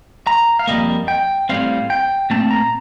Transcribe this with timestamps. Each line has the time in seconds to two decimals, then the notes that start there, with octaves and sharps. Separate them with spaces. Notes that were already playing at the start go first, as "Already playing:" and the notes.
0.27 A#5
0.59 F5
0.67 F2 C3 G3 A#3 D#5
1.08 G5
1.49 A2 G3 C4 F5
1.90 G5
2.30 A#2 A3 C4 A5
2.51 A#5